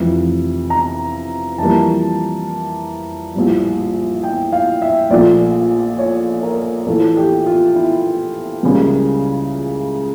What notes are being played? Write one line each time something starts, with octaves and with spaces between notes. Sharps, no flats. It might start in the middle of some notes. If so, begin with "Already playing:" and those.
Already playing: F1 F2 E3
A#5
F2 E3 G3 A#3 A5
A#1 A2 G3
G5
F5
E5
A#1 A#2 F3 A3 D5
C#5
A#4
A#1 A2 E3 A4
G4
F4
E4
C#2 C#3 G3 A#3